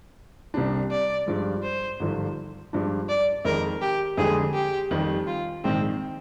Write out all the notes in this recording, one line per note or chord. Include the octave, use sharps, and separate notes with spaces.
C2 C3 G3 D4
D5
G2 F3 G#3
C5
G#1 G2 D3 F3
G2 F3 G#3 D4
D5
F2 D#3 G#3 A#4
G4
F2 D3 G#3 G#4
G4
F2 D#3 G3
F4
A#1 G#2 D#3 C4